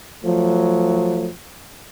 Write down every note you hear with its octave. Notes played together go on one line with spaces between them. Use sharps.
F3 F#3 A3